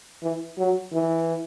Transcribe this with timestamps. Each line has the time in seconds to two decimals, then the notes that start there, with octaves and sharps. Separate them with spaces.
0.23 E3
0.58 F#3
0.93 E3